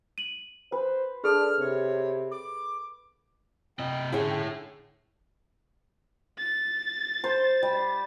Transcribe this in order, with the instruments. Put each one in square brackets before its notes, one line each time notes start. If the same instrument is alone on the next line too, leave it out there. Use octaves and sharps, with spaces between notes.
[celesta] D#7 F#7
[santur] B4 [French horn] C5
[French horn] D4 [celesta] G#4 A4 [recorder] F6
[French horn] C3 [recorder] C#5
[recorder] D6
[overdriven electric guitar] C3 D#5 [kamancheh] G5
[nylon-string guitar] D3 C#4 G#4 [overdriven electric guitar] E4 C#5
[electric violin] A6
[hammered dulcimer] C5
G3